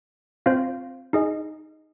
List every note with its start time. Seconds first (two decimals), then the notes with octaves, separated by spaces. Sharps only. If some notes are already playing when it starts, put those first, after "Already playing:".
0.46 C4 F4 C5 F5
1.13 D#4 G#4 D#5